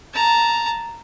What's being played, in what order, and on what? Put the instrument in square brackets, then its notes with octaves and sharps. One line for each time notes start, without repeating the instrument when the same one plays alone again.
[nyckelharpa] A5 A#5